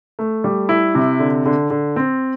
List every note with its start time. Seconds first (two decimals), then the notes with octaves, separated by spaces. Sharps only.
0.19 A3
0.44 G3
0.69 E4
0.95 C3
1.19 D3
1.46 D3
1.70 D3
1.96 C4